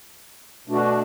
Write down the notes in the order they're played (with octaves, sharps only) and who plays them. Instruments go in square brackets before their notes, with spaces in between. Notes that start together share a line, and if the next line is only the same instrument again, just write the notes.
[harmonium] B2 A3 D4 F#4